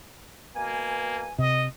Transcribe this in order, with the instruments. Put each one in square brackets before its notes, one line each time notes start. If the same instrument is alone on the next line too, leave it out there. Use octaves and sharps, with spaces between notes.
[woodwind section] B2 G#5 [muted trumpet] A#3
[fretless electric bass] C3 [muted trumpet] D#5